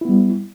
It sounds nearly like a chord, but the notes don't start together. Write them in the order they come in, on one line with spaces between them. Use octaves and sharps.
E4 B3 G3